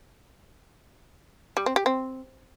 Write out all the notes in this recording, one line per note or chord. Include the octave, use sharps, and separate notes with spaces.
G3
C4
G4
C4